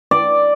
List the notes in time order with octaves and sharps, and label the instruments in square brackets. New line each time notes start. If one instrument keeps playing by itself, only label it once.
[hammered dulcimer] D5